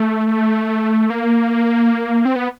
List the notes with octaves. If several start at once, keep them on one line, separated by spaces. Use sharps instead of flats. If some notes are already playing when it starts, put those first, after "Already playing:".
Already playing: A3
A#3
C4
B3